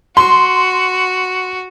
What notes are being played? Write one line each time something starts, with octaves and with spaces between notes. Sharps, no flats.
F#4 C6